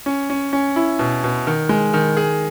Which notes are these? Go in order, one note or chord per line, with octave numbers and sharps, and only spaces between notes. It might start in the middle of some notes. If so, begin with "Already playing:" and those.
C#4
C#4
C#4
E4
B2
B2
D#3
G#3
D#3
G#4